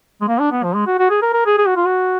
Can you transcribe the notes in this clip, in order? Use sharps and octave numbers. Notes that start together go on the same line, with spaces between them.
G#3
A#3
D4
B3
F3
G#3
F#4
F#4
G#4
A#4
A#4
G#4
G#4
F#4
F4
F#4